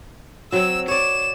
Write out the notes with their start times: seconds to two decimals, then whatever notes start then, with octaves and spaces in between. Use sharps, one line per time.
0.52 F#3 C4 E6
0.88 C#5 D5 E7